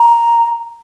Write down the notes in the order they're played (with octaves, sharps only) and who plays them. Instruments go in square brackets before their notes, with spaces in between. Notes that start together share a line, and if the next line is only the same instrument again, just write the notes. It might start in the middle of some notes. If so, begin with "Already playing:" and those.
Already playing: [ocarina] A#5